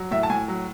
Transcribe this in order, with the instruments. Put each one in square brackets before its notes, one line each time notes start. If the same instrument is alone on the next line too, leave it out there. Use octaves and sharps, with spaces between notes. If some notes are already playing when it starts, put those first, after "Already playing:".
Already playing: [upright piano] F#3
A2 E5
A5
A2 G#5
F#3